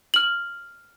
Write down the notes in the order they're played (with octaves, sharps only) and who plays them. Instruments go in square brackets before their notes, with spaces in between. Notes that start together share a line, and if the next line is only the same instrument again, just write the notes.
[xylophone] F6 F#7